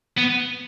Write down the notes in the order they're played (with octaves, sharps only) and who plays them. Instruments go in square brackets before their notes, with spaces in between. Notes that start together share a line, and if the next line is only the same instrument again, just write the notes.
[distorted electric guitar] B3